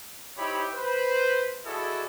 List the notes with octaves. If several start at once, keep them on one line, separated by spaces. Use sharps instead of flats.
D#4 E4 G4 C5 C#5 B5
B4 C5
E4 F#4 G#4 A4 D5 D#5